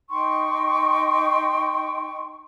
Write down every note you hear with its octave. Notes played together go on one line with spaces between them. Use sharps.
D#4 G5 C6 C#6